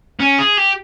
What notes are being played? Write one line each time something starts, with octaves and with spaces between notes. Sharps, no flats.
C#4
G#4
G4